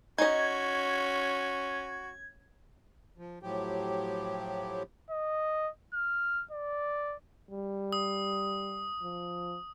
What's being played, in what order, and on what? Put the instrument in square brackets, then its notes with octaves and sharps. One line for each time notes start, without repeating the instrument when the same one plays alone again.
[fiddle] C#4 [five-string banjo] D#4 D#5 [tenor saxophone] F#4 [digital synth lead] G#6
[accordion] F3
A2 F3 F#3 G4
[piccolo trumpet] D#5
F6
D5
[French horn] G3
[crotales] D#6
[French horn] F3